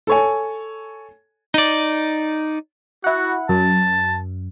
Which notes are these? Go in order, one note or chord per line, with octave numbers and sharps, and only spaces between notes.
A4 C#5 G#5
D#4 D5
E4 F#4 F#5
F#2 A5